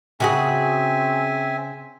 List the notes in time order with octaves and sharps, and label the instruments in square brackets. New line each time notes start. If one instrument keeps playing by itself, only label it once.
[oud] C#3 F#4 G#4 [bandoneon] C4 E5 G#5